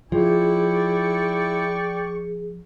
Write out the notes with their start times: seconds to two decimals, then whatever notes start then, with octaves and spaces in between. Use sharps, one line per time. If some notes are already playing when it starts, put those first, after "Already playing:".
0.12 F3 E4 G#4 D5 G5 C#6